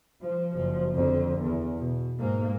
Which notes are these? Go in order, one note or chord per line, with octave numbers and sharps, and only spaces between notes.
F3
F#1 F3
F2 D3
E2
B2
G#2 A#3